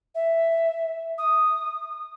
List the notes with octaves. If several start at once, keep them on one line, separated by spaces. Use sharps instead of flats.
E5
D#6